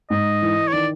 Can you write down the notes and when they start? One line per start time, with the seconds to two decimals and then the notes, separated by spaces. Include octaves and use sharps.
0.10 G#2 D#5
0.42 E3
0.68 C#5
0.73 D#3 D5